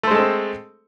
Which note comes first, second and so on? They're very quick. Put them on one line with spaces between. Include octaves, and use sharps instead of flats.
A3 C5 G#3 A4 C4